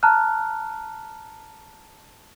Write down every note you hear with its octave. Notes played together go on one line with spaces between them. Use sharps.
A5 A#5 F6 F#6